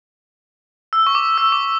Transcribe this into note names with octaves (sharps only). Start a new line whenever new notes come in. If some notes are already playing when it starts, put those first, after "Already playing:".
E6
C#6
D6
E6
D6